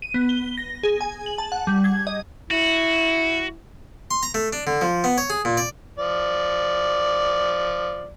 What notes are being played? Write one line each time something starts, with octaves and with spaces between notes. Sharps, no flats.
D#7
B3
G7
A#6
G#4
G#5
F#7
A5
F#5
G3
G#6
D#5
E4 F#4
C6
A#5
A3
D4
D3
F3
B3
C#5
G#4
A#2
D5
F3 D5